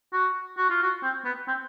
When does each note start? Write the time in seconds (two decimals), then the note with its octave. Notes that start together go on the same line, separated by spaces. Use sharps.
0.13 F#4
0.58 F#4
0.70 F4
0.83 F#4
1.03 C4
1.25 B3
1.48 C4